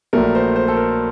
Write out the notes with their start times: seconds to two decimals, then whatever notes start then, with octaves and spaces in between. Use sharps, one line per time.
0.13 A#1 A#2 F#3 A3 A#4
0.35 C5
0.56 C5
0.68 A4
0.76 A#4